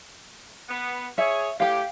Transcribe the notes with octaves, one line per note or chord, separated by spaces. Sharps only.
B3
G#4 C#5 E5
A2 G4 F5 G5